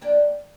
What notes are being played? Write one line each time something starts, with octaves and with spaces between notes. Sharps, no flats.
F3 A#3 D4 G5